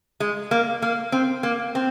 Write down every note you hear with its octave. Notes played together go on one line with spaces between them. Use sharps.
G#3
A#3
A#3
C4
A#3
C4